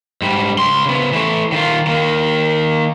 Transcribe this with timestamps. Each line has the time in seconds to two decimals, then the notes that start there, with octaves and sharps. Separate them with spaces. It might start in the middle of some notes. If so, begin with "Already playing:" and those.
0.22 G#2 G3
0.58 C#2 C6
0.86 C#3 B3
1.12 E3 A3
1.52 D#3 F4
1.87 D#3 A#3